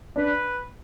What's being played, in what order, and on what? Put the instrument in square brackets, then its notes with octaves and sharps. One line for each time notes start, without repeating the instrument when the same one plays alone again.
[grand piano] D4 [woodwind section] B4